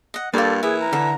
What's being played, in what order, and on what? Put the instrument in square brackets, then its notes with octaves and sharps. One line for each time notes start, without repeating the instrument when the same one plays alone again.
[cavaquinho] D#5 F#5
[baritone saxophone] G2 [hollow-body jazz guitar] A#3 [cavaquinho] F4 D5 [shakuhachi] A4
[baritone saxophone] E3 [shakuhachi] G#4 [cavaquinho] E5
[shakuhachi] A#5
[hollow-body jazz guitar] D3 [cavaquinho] A4 E5